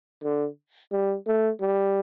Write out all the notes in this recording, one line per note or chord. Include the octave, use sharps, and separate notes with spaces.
D3
G3
A3
G3